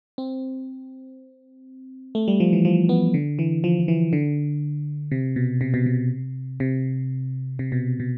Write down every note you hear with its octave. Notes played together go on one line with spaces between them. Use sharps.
C4
A3
G3
F3
E3
F3
B3
D3
E3
F3
F3
E3
D3
C3
B2
C3
B2
C3
C3
C3
B2
B2